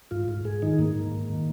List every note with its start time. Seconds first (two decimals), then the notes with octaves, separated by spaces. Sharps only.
0.11 G#2 F4
0.28 G#2
0.45 G#2 G#4
0.62 D#3 D#4
0.79 G#2 A#3
0.95 G#2
1.12 G#2
1.29 D#3